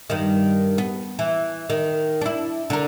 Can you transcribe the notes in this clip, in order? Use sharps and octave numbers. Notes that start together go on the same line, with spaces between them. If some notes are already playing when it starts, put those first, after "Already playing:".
G2 D#3
B3
E3
D#3
D4 E4
D3 A#4